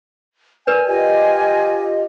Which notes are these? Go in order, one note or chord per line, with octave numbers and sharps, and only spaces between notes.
A#4 B4 D5 G#5
F4 G4 D#5 G#5